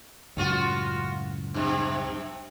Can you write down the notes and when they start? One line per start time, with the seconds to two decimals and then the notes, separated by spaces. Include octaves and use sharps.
0.37 C#2 F#2 A2 B3 F4 F#4
1.54 G2 C3